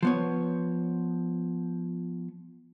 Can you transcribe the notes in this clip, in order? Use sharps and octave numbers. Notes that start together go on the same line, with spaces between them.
F3 B3 C#5